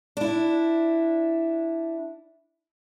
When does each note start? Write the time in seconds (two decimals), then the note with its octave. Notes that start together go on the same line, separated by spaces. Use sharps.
0.17 D4 E4